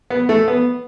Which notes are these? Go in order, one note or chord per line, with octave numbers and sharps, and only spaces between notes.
B3
A3
B3